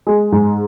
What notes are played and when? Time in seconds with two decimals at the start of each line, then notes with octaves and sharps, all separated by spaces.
0.07 G#3
0.32 G#2